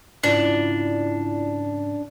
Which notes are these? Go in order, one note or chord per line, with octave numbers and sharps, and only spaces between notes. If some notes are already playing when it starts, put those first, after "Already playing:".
G#2 C#3 C#4 D4 E4 F4 D5